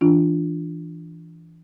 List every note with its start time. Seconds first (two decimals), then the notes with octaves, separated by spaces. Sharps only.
0.01 E3 D4 F4